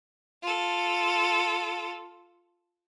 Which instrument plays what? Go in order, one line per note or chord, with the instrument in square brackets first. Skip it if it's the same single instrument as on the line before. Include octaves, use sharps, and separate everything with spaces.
[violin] F4 A4